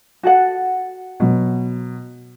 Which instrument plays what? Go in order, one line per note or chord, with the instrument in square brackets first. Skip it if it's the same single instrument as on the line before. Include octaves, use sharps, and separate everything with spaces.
[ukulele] F#4 A4 F#5
[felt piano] B2 F#3